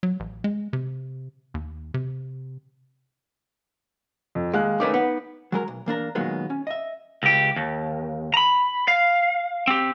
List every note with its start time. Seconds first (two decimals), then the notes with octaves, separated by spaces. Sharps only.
0.03 F#3
0.20 A1
0.44 G#3
0.73 C3
1.54 D#2
1.94 C3
4.35 F2
4.53 D#2 G#3 F5 F#6
4.80 D#3 A3 C#4 D#4 B4 D6
4.94 B3
5.52 F#3 G#3 A#4
5.68 B1
5.86 E2 A#3 D4 A#4
6.15 A#2 D#3 F#3 G#3 A#3 B3
6.50 C#4
6.67 D#5 E5
7.23 C#2 G4
7.56 D#2
8.34 A#5 B5
8.88 F5
9.67 C4 G4